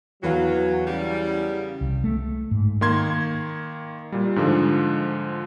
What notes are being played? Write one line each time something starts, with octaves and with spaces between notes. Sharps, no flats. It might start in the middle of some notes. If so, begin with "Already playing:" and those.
E2 F#3 B4 F5
C#3 G3
C2
A3
G#2
D#3 A#3 C6 G#6
A#2 G3
G#2 D3 F3